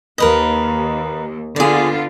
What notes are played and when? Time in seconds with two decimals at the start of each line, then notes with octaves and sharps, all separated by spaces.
0.18 D#2 A#4 B4 D#5
1.56 D3 B3 F4 G#4 D5